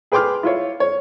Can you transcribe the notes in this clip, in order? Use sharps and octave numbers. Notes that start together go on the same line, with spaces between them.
G#4 B4 G5 C6 D6 F6
E4 F4 C#5
C#5